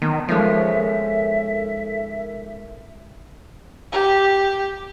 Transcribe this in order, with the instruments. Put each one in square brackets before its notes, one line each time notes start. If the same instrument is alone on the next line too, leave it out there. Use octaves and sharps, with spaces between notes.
[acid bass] D#3 [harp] B3 [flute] A5
[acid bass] F3 [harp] G#3 C#4 D#4 [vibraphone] A4 A#4 [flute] E5
[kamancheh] G4